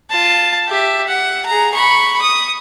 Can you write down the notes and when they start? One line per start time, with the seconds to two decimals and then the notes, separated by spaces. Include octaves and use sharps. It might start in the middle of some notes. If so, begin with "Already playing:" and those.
0.10 F4 A5
0.68 G4 E5
1.07 F#5
1.46 G#4 A#5
1.74 B5 C#6
2.21 D#6